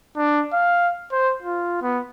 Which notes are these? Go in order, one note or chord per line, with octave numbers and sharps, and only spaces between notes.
D4
F5
C5
F4
B3